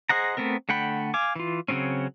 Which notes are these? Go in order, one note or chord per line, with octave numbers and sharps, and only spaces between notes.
G#4 C5 D#5 F#5 A#5
A3 B3 C4 A#4
D3 A3 F#5 G5 B5
F5 G#5 D6
E3 F4
C#3 F#3 G3 C4 C#4